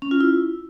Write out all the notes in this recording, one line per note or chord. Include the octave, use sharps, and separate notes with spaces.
C#4
F4
E4